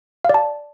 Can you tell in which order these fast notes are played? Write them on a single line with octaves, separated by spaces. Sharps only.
F5 D5 A5